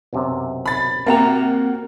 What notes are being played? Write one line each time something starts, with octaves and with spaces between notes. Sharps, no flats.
B1 F#2 C3
B5 A6
A#3 C4 F#4 G4 A#4 E5 F#5 A#5